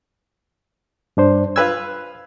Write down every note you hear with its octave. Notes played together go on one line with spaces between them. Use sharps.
G2 D4 C5
F4 B4 E6 G#6